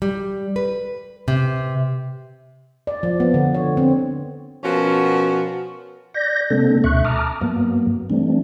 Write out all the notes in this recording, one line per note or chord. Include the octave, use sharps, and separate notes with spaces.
G3
B4
C3
D5
F3
B3
D3
C#5
C4
B2 F3 B3 C#4 F#4 A#4
D5 G6 A#6
C3 G#3 A#3 C4 D4 A4
D2 B2 E5 C#6 F#6
A5 A#5 D6 D#6 F6
G2 F#3 A#3 B3
E3 G3 A3 C4 D4